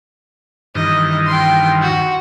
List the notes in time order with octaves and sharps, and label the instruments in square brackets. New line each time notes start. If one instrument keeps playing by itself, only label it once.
[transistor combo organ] G2 D#3 E3 [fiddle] D#5
[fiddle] G5 C6
F#4